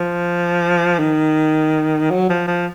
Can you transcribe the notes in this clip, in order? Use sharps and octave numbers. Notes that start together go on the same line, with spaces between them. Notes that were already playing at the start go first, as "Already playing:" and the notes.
Already playing: F3
D#3
F#3
F3
F3